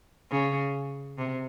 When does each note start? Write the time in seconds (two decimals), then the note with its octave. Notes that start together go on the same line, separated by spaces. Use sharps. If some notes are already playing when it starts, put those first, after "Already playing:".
0.31 C#3
1.18 C3